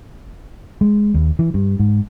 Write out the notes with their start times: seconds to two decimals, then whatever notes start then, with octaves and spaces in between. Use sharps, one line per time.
0.81 G#3
1.14 D#2
1.39 E3
1.54 G2
1.80 G#2